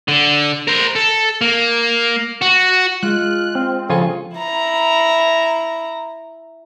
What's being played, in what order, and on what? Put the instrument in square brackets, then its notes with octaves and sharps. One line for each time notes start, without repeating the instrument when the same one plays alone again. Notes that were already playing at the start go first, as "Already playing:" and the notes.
[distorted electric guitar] D3
A#4 C5
A4
A#3
F#4
[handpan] G#3 [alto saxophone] F4 [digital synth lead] F#6
[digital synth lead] C4 [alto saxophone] F4
[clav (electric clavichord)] C#3 F4 G#5 [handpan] F3 [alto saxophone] A4
[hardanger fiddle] E4 A#5